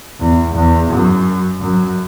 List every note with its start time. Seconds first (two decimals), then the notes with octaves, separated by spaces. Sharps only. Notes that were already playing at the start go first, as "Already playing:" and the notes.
0.20 E2
0.55 E2
0.90 F#2
1.61 F#2